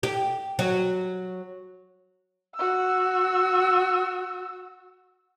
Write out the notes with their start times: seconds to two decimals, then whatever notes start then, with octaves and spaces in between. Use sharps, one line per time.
0.03 G4
0.59 F#3
2.56 F#4 E6